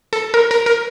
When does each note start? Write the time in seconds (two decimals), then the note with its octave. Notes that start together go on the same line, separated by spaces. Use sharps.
0.13 A4
0.34 A#4
0.51 A#4
0.66 A#4